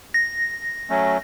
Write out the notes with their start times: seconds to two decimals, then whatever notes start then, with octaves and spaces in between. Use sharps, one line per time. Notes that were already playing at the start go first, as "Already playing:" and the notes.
0.14 A#6
0.90 F#3 A3 C#4